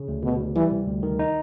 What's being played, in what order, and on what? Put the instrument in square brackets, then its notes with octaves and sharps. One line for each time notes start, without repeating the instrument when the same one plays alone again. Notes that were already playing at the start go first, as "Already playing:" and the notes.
Already playing: [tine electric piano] C#3
D2
[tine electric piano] D2 [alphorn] B2
[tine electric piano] D2
[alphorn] E3 [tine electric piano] G3
[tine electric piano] C3
D2
D#3
D#4